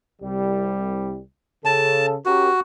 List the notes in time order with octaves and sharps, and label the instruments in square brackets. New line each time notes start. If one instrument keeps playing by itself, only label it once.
[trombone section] C2 G3
[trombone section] C#3 A4 [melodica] A5
[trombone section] C#4 G4 A#4 [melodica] F#4